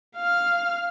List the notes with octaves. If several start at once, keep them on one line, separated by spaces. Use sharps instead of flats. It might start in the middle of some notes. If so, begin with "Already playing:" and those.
F5 F6